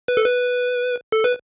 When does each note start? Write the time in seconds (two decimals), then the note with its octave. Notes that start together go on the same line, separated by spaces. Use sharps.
0.08 B4
0.17 A4
0.25 B4
1.12 A4
1.24 B4